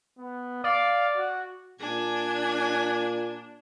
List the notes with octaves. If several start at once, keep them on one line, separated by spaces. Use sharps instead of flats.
B3
D5 F5
F#4
A#2 D4 G#5